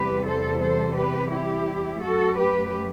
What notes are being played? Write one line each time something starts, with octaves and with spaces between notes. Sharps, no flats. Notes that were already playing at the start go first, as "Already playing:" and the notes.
Already playing: E2 C3 E3 G3 G4 B4
A4 C5
A4 C5
G4 B4
E4 G4
F#2 F#3 A3 F#4 A4
G4 B4